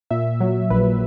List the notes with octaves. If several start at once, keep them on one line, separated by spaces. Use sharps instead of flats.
A#2 E5
F#3
A#1 B4